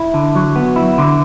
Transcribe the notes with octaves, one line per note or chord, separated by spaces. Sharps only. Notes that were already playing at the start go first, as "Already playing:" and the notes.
Already playing: E4
D3
F#3
B3
E4
D3